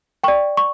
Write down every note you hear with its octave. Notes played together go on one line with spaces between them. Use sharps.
D5 G5 C#6
C#6